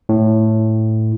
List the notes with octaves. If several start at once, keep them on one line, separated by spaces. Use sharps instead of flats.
A2